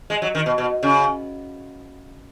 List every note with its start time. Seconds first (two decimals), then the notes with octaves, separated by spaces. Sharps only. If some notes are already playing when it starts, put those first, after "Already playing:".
0.10 G#3
0.22 F#3
0.35 D#3
0.46 B2
0.58 B2
0.83 C#3